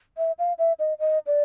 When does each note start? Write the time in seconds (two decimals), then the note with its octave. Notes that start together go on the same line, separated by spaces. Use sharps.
0.18 E5
0.39 F5
0.59 E5
0.79 D#5
1.00 D#5
1.27 D5